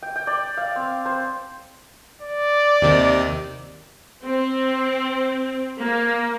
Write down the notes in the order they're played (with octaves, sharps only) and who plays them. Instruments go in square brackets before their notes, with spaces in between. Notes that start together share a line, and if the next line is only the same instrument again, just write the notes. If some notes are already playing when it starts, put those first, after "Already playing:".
[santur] G5
G5
D5
F5
C4
C5
[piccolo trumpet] D5
[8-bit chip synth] D#2 C3 D#3
[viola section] C4
A#3